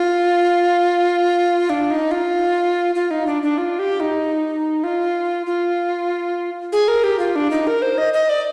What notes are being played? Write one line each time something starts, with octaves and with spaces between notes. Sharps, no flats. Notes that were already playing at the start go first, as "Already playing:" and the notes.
Already playing: F4
D4
D#4
F4
F4
D#4
D4
D4
F4
G4
D#4
F4
F4
G#4
A#4
G4
F4
D4
D#4
A#4
C5
D#5
D#5
D5